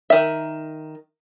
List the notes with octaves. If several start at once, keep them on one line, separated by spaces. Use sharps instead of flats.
D#3 E5